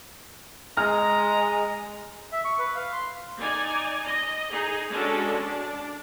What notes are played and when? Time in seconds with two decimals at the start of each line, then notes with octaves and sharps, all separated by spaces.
0.77 G#3 G#5 A#5 F6
2.33 E5
2.45 C#6
2.59 B4
2.75 F5
2.93 C6
3.38 D#4 D5 G#5
4.06 D#5
4.52 D#4 G#4
4.88 G#3 C#4 D4 F#4 A4
5.39 D4